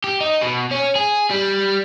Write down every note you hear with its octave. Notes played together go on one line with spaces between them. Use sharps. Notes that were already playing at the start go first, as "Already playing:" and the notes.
G4
D#4
B2
C#4
G#4
G3